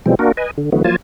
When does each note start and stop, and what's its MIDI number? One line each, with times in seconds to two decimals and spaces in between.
0.06 0.15 47
0.06 0.15 52
0.06 0.15 53
0.06 0.15 55
0.06 0.15 56
0.06 0.15 60
0.19 0.32 58
0.19 0.32 62
0.19 0.32 66
0.19 0.32 70
0.37 0.51 71
0.37 0.51 75
0.37 0.51 80
0.58 0.70 50
0.72 0.83 50
0.72 0.83 52
0.72 0.83 54
0.72 0.83 57
0.72 0.83 59
0.84 0.96 53
0.84 0.96 54
0.84 0.96 58
0.84 0.96 65
0.84 0.96 80
0.84 0.96 81